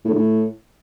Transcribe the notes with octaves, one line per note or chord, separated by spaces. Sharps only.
A2
D3
A2